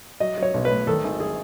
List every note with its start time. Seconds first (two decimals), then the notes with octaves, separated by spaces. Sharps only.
0.20 F#3 D#5
0.38 F#3 C#5
0.54 B1
0.65 B4
0.70 A2
0.87 D#3 A4
1.04 G#1
1.20 G#4